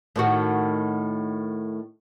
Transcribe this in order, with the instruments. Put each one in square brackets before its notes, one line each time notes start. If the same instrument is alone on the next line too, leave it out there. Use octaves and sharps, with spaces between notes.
[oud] A2 D#3 F#4